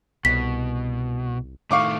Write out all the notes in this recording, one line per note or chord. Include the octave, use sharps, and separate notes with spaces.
C2 B2 B6
A2 D#3 A3 F5 C#6 D6